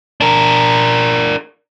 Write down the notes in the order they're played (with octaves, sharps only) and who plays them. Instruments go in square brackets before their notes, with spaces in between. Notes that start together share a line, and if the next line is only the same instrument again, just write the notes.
[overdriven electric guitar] D4 A#4